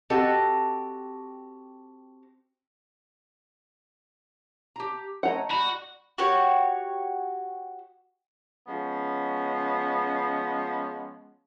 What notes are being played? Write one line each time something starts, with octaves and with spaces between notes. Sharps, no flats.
C4 F#4 G4 A4 D#5
G4 A#5
A3 C#5 D#5 F#5 A#5
G3 F#4 B5
F#4 G4 C#5
F3 G#3 B3 C#4